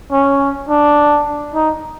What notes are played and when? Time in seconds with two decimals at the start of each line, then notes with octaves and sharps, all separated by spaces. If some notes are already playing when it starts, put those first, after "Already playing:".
0.12 C#4
0.69 D4
1.54 D#4